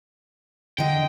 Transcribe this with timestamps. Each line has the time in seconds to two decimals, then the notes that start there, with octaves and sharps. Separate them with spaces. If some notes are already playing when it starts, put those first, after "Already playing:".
0.78 D3 D#5 G5